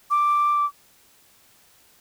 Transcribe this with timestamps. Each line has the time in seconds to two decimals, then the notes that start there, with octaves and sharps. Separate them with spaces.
0.10 D6